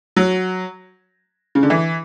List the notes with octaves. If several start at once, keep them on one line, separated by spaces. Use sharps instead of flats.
F#3
C#3
D3
E3